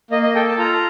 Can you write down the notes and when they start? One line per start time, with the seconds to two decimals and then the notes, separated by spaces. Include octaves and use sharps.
0.11 A#3 D#5
0.23 D#5
0.35 A4 G5
0.47 A5
0.58 F4 A#5